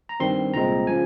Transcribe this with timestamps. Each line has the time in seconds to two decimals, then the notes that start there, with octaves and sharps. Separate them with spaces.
0.09 A#5
0.20 G2 D#3 G3 C4 C6
0.54 C2 A#2 G#3 C4 A#5
0.87 C#3 F3 G#5